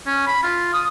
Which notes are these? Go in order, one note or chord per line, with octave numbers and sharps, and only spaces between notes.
C#4
B5
F4
D#6